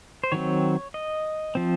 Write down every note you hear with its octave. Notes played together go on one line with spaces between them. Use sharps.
C5
D#3 F#3 C4 C#5
D#5
F3 C4